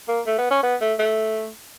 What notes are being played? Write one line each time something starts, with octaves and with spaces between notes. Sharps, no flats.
A#3
A3
B3
C#4
B3
A3
A3